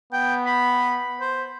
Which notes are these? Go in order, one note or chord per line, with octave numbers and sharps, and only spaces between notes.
B3 G5
B5
C5